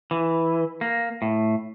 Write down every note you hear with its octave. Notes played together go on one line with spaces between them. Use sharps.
E3
A#3
A2